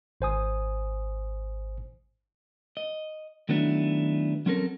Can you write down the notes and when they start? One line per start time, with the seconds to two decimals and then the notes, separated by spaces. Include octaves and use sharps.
0.21 G#1 C5 G#5 D#6
2.77 D#5
3.49 D#3 F#3 A3 B3 D4 E4
4.46 F#3 C4 C#4 G4 A4 A#4